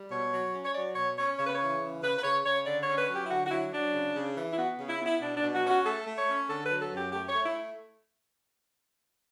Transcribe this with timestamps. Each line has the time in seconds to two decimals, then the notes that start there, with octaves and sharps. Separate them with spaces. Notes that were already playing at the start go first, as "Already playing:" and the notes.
Already playing: G3
0.11 B2 C#5
0.32 F#3
0.54 C#4
0.65 C#5
0.75 F#3 D5
0.96 B2 C#5
1.18 C#4 C#5
1.39 C#3 C#5
1.47 B4
1.55 C#5
1.60 E3
1.81 C#3
2.03 C#3 B4
2.19 B4
2.24 C#3 C#5
2.45 C#3 C#5
2.66 D3 D5
2.82 C#5
2.88 C#4
2.98 B4
3.09 F#3
3.14 G4
3.25 E4
3.30 D3 F#4
3.47 F#4
3.51 F#3 E4
3.72 F#3 D4
3.94 C#3
4.16 C#3
4.37 E3
4.52 E4
4.58 B3 F#4
4.79 C#3
4.89 E4
5.00 B3
5.06 E4
5.21 B2 D4
5.37 D4
5.43 B2
5.54 F#4
5.64 C#4
5.70 F#4
5.85 A3 A4
6.07 A3
6.18 C#5
6.28 C#4
6.49 D3 A4
6.65 B4
6.70 F#3
6.82 A4
6.92 F#2
6.97 G4
7.13 A3 G4
7.29 C#5
7.34 A3
7.45 E4